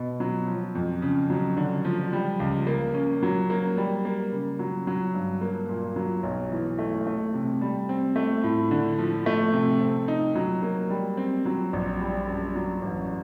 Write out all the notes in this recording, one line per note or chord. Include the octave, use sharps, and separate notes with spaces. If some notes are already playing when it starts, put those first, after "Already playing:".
Already playing: B2
F#3
F3
F2
C#3
F#3
D3
F3
G3
C#2
A#3
C#4
F#3
A#3
G3
A#3
C#3
F#3
F#3
G2
A#3
A#2
F#3
B1
E3
A3
A3
C3
G3
C4
A3
A2
D3
F3
A3
C3
C4
D#4
F#3
A#3
G3
C4
F#3
A#1
G3
F#2
F#3
A1